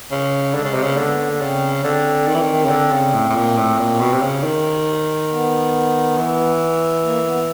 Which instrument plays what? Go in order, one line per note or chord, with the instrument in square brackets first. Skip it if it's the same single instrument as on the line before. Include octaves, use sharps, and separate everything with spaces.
[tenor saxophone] C#3
[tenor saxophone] D3 [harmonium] G#3
[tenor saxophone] C#3
C3
[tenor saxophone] C#3 [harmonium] A#3
[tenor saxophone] D3 [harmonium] B3
[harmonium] A#3
B3
[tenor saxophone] C#3 [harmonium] C4
[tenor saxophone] D3 [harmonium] C4
[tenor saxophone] D#3
E3
D#3
C#3
D3
C#3
A2
A2
A#2
A2
A#2
B2
C3
C#3
D#3
[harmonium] B3
[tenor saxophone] E3
[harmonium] A#3
B3